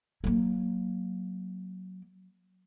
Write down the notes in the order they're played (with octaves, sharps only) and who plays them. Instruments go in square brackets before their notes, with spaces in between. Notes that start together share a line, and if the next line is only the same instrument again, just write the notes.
[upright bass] F#3 A#3